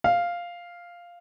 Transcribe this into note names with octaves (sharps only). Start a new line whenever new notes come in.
F5